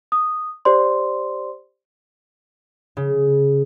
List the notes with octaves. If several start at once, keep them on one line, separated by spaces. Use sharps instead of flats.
D#6
G4 C5 D5 C6
C#3